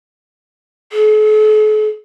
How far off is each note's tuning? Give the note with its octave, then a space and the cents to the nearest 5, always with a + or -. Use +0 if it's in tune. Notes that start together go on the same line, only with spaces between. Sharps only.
A4 -45